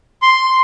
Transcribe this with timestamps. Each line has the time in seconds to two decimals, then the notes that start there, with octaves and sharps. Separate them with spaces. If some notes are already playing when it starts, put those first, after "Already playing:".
0.22 C6